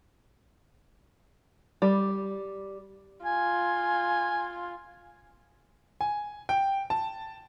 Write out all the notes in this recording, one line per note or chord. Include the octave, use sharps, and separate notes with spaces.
G3
F4 G#5
G#5
G5
A5